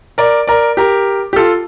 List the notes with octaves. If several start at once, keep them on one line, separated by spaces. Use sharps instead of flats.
A#4 D5
A#4 D5
G4 A#4
G4
F4 A4